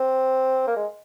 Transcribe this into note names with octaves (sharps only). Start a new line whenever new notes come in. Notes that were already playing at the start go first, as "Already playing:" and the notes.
Already playing: C4
A#3
G#3